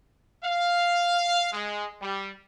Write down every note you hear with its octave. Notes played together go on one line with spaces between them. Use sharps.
F5
G#3
G3